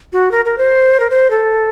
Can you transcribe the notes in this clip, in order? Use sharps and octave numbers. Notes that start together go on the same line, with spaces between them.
F#4
A#4
A#4
C5
A#4
C5
A4